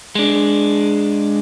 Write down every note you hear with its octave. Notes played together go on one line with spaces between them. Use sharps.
G#3 D4